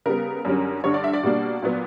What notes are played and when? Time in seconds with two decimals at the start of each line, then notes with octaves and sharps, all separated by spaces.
0.06 C#3 G3 B3 A#4
0.45 F#2 D3 G3 C#4
0.84 G2 D3 G3 C#5
0.94 D5
1.04 E5
1.13 D5
1.23 B2 G3 A#3 D4
1.62 A#2 F#3 B3